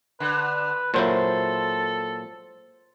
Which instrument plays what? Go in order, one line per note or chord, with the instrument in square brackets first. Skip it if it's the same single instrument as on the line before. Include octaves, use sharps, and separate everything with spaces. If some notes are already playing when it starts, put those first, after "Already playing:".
[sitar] D3 [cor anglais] B4
[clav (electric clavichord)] A#2 F#3 E4 [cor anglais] A4 [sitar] C5